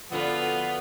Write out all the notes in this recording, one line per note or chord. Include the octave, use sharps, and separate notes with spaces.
D3 F3 B3 F4 F#4 B4